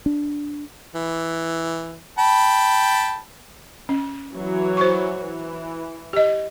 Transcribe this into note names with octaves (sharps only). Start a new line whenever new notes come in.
D4
E3
G5 A5 B5
C#4
E3 F#3 C#5
C5 C#6
E3
G4 D#5